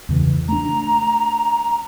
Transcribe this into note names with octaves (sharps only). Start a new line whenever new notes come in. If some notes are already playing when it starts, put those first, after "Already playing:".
E2 C#3 E3
A3 D4 A#5